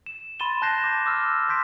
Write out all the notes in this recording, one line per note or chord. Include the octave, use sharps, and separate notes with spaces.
E7
B5 C6 A6 D#7 E7 G7
A5 F#6 G6 A#6 C7 E7
D6
D6 E6 F6
C6 D6 G6 B6 D7